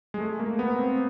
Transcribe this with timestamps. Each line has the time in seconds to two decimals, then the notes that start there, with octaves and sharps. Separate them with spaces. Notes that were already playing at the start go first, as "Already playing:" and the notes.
0.14 G#3
0.20 A3
0.40 A#3
0.59 B3
0.79 C4